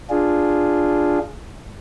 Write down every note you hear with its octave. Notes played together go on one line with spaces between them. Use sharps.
D4 F4 G#4